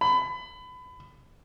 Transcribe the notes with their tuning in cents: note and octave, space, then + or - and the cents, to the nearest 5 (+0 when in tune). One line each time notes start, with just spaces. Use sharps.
B5 +25